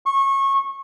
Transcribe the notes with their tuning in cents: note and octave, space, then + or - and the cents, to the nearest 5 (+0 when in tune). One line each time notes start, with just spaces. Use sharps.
C#6 -25